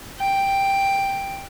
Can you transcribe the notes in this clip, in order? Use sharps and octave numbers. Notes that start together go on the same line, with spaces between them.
G5